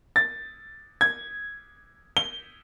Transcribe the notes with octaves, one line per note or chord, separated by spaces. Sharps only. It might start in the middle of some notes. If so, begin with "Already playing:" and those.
A6
G#6
G7